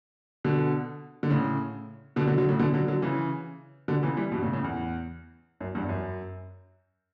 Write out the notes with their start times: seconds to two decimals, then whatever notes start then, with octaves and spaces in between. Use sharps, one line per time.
0.44 B2 D3
1.23 D3
1.30 A2 C#3
2.16 B2 D3
2.27 D3 F#3
2.38 D3 F#3
2.49 A2 C#3
2.59 B2 D3
2.74 D3 F#3
2.88 D3 F#3
3.02 C#3 E3
3.88 B2 D3
4.03 C#3 E3
4.17 E3 G3
4.32 G2 B2
4.42 A2 C#3
4.53 A2 C#3
4.64 E2
5.60 F#2
5.75 E2 G2
5.89 F#2